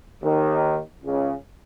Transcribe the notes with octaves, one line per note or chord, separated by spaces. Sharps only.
D#2 D#3
C#2 C#3